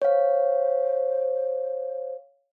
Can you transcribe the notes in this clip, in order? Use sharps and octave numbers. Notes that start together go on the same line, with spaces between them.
C5 C#5 F5